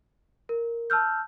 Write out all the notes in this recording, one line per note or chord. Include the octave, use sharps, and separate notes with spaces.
A#4
A5 E6 F6 G6